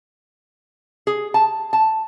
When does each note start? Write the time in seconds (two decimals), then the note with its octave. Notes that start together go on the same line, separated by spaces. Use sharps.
1.07 G#4
1.34 A5
1.73 A5